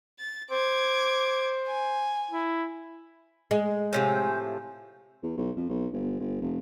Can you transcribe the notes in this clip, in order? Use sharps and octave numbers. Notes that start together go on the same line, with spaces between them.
A6
C5 D6 G#6
G#5
E4
G#3
A2 C3 F3 G#5 G6
E2
B1
F2
B1
G1
G1
F1